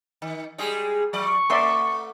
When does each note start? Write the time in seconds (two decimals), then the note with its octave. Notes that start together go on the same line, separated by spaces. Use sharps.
0.22 D#3
0.58 G3 G#3 G#4
1.13 F#3 D5 C#6
1.50 A3 D5 E5 C6